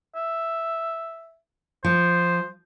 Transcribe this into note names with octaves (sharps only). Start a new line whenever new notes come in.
E5
F3 C5